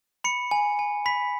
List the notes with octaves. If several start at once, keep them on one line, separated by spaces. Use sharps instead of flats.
B5 C#7
G#5
G#5
B5 B6